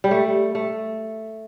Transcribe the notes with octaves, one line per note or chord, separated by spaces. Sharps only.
G3
A3
A3